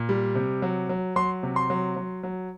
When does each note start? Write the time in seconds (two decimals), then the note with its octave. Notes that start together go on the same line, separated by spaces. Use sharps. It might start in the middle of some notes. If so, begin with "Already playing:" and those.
Already playing: A#2
0.09 G3
0.35 C3
0.62 F#3
0.89 F#3
1.16 F#3 C6
1.43 C3
1.56 C6
1.70 F#3
1.96 F#3
2.23 F#3